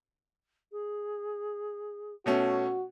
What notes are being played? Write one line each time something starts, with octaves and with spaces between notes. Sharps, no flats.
G#4
B2 A3 C#4 F#4 C#5